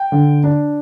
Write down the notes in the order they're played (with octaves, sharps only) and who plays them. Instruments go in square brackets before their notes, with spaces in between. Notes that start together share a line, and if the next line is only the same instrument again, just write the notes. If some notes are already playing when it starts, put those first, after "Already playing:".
Already playing: [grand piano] G5
D3
D4